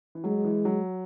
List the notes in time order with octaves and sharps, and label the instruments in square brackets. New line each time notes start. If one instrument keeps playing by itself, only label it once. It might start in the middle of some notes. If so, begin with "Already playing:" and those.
[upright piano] E3
[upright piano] F#3 [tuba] G#3
[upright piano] E3
F#3